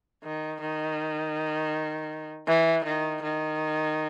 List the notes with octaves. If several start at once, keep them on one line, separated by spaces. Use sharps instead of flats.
D#3
D#3
E3
D#3
D#3